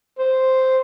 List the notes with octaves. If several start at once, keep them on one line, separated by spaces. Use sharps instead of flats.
C5